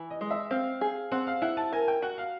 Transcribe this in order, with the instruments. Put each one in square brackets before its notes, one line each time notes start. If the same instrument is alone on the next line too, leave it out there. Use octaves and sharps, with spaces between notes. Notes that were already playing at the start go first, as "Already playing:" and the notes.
Already playing: [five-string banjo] E3
[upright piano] D#5
[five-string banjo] G#3
[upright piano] E5
[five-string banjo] C4 [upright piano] F5
[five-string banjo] G#4
[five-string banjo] C4 [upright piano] F#5
[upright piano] F5
[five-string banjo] E4 [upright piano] F#5
[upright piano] A5
[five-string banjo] A#4 [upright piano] G#5
[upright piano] G5
[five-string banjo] F#4 [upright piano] F#5
[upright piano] F5